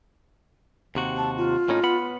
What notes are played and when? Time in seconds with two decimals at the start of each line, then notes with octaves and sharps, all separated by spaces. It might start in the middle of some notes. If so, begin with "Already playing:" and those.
0.95 D#2 C3 F#4
1.17 A5
1.38 F4
1.69 A2 C#4 D#4
1.83 B3 F#5 B5